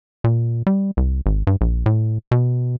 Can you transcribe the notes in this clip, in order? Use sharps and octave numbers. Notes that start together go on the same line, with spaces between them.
A#2
G3
C2
G#1
G2
A#1
A2
B2